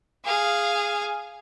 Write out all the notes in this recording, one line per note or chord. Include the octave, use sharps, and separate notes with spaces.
G#4 F5